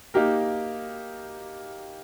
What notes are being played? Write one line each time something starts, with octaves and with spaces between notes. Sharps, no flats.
A#3 D#4 G4 A#4